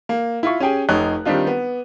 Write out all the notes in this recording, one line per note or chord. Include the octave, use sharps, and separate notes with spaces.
A#3
E4 F4 C#6
C#4 G4 G#4 G5 G#5
F1 D#4 C#5 F#6
D#3 G3 C4 D4 D#4 F4
B3